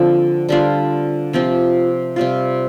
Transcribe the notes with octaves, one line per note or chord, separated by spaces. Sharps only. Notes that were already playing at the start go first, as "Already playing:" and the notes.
Already playing: D3 F3 C4
D3 G3 D4 F4
C3 F3 C4
C3 G3 C4 F4